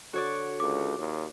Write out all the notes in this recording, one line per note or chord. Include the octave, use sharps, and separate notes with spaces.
D3 F#4 C#5 D5
C#2 D6
D#2